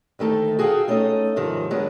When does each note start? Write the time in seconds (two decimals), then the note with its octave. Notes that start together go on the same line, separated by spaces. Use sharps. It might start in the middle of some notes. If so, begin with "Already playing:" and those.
0.19 D2 D#3 A3 D#4 A4
0.59 F#4 G#4 A4 D5 F5 G5
0.88 A3 C#4 D#4 A4 D#5
1.36 G#2 C3 D#3 F3
1.71 D#3 F#3 G#3 B3 D4